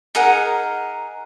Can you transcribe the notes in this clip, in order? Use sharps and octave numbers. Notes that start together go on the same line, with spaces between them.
D#4 G#4 A#4 F#5